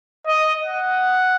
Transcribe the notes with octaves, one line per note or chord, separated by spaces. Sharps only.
D#5
F#5